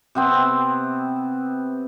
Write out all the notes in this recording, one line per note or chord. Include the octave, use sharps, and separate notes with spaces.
C3 B3 C4